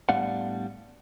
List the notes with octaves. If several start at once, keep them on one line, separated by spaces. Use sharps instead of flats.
A2 G3 B3 D4 F5 F#5